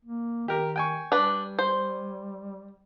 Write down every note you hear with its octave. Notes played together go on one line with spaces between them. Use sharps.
A#3
D#3 G4 A#4
G5 G#5 C#6
G3 D4 B4
C5